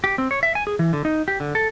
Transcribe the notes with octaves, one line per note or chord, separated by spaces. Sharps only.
G4
C4
C#5
E5
G#5
G#4
E3
D3
D#4
G4
D3
A4